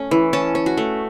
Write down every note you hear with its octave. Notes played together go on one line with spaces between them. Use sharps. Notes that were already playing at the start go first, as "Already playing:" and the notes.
Already playing: A3 C#4
E3
C#4 A5
C#4
F#4
A3